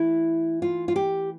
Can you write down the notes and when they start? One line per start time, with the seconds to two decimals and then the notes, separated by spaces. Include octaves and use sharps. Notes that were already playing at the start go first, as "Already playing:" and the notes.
Already playing: E3 A3 E4
0.62 F4
0.88 F4
0.96 G4